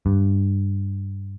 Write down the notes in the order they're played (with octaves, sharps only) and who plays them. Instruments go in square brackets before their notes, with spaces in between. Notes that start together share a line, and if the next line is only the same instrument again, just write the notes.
[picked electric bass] G2